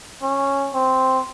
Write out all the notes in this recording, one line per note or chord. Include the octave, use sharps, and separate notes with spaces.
C#4
C4